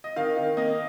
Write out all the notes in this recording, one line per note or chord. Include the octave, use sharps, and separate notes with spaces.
D#5
D#3 F5
D#3
A#3 D#5